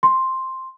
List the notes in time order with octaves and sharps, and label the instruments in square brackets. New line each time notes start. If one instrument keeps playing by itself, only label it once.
[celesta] C6